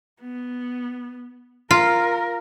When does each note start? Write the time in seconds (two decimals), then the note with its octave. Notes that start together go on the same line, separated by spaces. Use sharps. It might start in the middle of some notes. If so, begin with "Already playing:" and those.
0.20 B3
1.71 F4 A#4